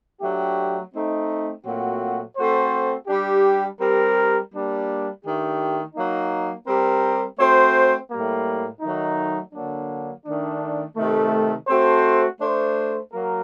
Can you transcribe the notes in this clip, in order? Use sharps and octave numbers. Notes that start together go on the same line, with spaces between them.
F#3 A3 D4 G4
A3 C4 D#4
A#2 F#3 A3 C4 F#4
A3 C4 F#4 A4 C5
G3 D4 G4
G3 C4 G4 A#4
G3 A#3 D4
D#3 A3 D4 G4
F#3 A#3 D#4
G3 C4 G4 A#4
A3 C4 F#4 C5
A2 G3 A#3
D#3 F#3 A3 D#4
D3 F#3 A#3 D4
D#3 A3 D4
C3 D#3 A3
A3 C4 F#4 A4 C5
A3 D4 A4 C5
F#3 A#3 F#4 A#4